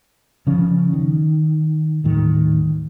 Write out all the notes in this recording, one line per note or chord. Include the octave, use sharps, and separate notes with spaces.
C#3 F3 C#4
D#3
D#1 A2 D#3